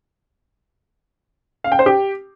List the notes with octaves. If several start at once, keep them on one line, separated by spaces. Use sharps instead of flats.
F5
G5
C5
G4